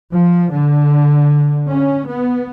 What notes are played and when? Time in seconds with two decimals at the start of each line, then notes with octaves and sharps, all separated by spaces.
0.11 F3
0.51 D3
1.68 C#4
2.07 B3